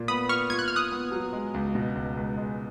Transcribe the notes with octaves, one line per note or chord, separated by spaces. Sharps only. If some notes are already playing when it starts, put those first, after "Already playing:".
Already playing: A#2 F4
B3 B5 D#6
F4 C#6 F6
F4 G#6
F#6
F4 F6
D#6 F#6
B3
F#3
G#3
C#2
B2
C#2
C#2
G#3